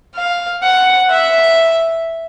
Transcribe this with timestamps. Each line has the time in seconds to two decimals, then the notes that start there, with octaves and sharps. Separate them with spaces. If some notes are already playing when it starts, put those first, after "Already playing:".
0.15 F5
0.62 F#5
1.10 E5